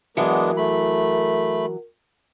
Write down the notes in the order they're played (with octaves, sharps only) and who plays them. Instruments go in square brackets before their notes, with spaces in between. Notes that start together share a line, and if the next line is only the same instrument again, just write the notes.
[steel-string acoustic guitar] E3 F#3 [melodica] G#3 B3 D4 [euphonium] A#4
[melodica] A3 B5